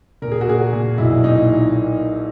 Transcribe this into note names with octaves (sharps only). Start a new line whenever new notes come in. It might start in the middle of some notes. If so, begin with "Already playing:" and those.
A#2 A#4
G#4
F#4
A#2 G#4
A#2
B1 E4
A#2 D#4